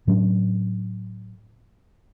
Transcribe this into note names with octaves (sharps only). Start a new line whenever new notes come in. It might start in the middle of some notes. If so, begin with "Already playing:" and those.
A2 F#3 C#4 D4